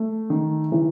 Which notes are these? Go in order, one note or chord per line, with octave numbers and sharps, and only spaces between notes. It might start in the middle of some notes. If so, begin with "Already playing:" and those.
Already playing: A3
D#3
E3